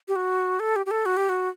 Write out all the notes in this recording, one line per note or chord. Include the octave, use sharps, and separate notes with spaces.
G4
F#4
A4
G4
G4
A4
F#4
G4
F#4